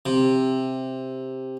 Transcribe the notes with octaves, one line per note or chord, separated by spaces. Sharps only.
C3